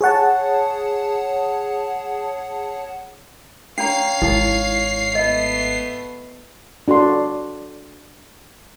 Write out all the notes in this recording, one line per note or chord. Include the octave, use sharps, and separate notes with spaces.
G#4 C#5 F#5 A5
C#4 D4 C#5 F5 A#5 C7
G#1 D#4 E4
A3 B3 D#5
D4 F#4 A4 C6